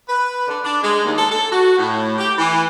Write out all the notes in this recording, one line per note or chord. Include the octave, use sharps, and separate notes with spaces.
B4
D3
D4
G#3
D#2
A4
A4
F#4
A2
G4
E3